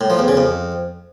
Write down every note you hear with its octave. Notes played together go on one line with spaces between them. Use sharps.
A2
F3
E2
C#3
F2